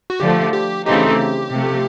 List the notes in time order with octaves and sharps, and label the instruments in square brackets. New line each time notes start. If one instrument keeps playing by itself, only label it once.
[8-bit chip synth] F#4
[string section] D3 F3 A3 [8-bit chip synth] G4
[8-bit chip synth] G4
[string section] C#3 E3 A3 C4 D#4 [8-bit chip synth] G4
[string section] C3 F3 A3